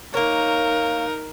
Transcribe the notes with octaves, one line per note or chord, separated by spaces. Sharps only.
A#3 D#4 A#4 C#5